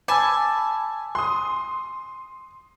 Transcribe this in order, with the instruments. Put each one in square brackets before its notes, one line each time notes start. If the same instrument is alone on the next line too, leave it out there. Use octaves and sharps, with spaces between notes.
[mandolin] G#5 A5 [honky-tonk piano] B5 [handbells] D6 E6
[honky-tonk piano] C6 D#6